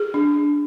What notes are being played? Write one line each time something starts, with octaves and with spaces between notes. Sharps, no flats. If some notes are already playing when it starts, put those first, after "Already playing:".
Already playing: G#4
D4